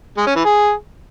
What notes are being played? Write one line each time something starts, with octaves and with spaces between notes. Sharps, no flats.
G#3
C#4
E3
G#4